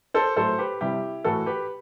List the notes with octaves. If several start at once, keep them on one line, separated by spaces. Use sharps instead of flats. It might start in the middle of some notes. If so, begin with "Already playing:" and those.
A4 C5
A2 F#3 A3 A4 C5
G4 B4
C3 G3 E4 G4
A2 E3 A3 F#4 A4
G4 B4